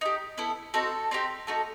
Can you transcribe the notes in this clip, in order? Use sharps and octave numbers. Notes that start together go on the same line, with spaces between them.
D#4 G4
B3 E4 A4
C4 D#4 F#4 A4
C4 D#4 G4
A3 D#4 F#4 A4